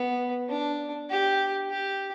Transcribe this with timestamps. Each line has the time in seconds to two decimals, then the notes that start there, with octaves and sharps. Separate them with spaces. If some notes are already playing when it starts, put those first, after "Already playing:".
Already playing: B3
0.49 D4
1.09 G4
1.70 G4